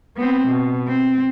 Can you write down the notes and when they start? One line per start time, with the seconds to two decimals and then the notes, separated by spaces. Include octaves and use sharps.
0.17 B3 C4
0.47 B2
0.87 C4